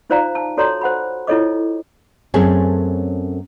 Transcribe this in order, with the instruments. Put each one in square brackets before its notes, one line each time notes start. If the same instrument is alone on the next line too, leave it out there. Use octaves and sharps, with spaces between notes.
[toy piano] D#4 F4 C5 D5 F5 A#5
A5
F#4 A4 C#5 D5 A#5 C6
C5 F#5 B5
E4 F4 A4 C#5 D#5 D6
[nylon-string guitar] F#2 A3 C4 C#4 G#4 A4